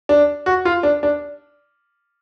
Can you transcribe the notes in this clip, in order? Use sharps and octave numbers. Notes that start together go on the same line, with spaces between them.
D4
F#4
F4
D4
D4